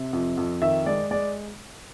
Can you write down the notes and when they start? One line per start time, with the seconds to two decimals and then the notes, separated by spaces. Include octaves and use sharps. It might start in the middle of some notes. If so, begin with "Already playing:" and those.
Already playing: C3
0.13 F2
0.37 F2
0.62 D#3 E5
0.86 G#3 D5
1.11 G#3 D5